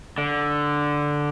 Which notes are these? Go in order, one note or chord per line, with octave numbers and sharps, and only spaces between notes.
D3